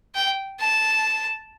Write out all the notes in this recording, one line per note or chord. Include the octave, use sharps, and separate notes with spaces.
G5
A5